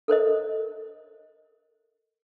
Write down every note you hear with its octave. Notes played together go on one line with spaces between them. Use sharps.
A4 A#4 C5 D#5